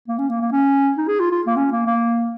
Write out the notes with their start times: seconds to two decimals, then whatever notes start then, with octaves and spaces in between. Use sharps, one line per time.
0.08 A#3
0.19 C#4
0.29 A#3
0.41 A#3
0.52 C#4
0.98 D#4
1.08 G#4
1.20 F4
1.31 F4
1.47 A#3
1.56 C#4
1.72 A#3
1.87 A#3